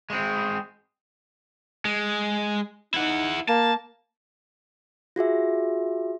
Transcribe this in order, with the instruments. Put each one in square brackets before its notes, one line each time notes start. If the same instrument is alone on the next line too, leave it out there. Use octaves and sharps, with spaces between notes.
[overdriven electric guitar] G#3 C4
G#3
[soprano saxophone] D#4 [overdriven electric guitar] E4 F#5
[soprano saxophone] A#3 [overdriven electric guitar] A5
[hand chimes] F4 F#4 G#4 E5